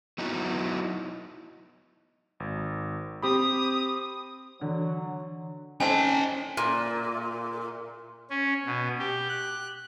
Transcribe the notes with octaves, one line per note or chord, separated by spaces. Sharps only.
F#3 B3 D#4 E4 F#4
G#1
C4 G4 B5 D#6
D3 E3 F#3
D#3 C4 C#4 A4 G#5 A5
A#2
C#4
B2
G4
F#6